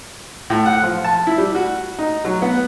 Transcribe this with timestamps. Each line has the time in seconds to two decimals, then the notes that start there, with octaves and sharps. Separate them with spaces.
0.50 A2
0.66 F#5
0.83 F3
1.05 A5
1.27 E4
1.38 G3
1.55 F#4
1.99 D#4
2.25 F#3
2.42 B3